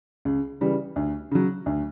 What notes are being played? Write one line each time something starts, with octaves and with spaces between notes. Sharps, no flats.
C#2
C#3 E3 G3
D2
C#3 F#3
D2